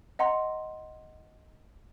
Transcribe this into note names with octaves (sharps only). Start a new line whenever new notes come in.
D#5 F#5 A#5 C6